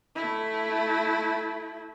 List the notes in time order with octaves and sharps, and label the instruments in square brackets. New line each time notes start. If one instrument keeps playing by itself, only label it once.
[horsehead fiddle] A3 E4